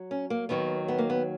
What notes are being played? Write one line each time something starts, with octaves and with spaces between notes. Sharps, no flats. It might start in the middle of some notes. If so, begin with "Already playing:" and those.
Already playing: F#3
C#4
A#3
D#2 D#3 F#3 B3
B3
A#3
B3